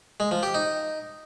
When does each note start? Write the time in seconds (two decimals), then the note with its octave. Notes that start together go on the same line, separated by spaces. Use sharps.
0.20 G#3
0.31 F3
0.43 G4
0.54 D#4